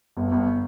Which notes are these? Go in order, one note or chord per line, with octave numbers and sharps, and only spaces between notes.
G1
G1